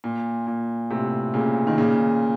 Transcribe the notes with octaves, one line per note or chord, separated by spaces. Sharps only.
A#2
A#2
A2 C3
A#2 C#3
D#3
A#2 C#3